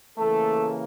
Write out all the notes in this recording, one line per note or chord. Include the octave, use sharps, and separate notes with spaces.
C#3 E3 A3 A#3 A4